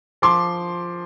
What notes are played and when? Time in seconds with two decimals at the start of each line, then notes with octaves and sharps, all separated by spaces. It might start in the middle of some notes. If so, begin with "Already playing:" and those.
0.22 F3 C6 D6